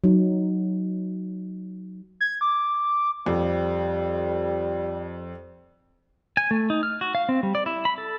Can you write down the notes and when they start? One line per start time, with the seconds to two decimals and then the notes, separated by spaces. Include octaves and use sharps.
0.04 F#3 D#4
2.21 G#6
2.41 D6
3.26 F2 G3
6.37 G#5
6.51 A3
6.70 D#4
6.83 F6
7.01 F#4
7.15 F5
7.29 C4
7.43 G3
7.55 D5
7.66 E4
7.85 B5
7.98 A4